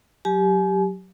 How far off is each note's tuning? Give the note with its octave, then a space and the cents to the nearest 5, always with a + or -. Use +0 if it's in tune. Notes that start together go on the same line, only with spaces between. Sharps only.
F#3 +0 G4 +0 G#5 +35